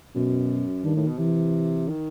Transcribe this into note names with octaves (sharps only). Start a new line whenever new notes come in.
F#2 B2
G2 D#3
A2
B2
C3 E3
D#3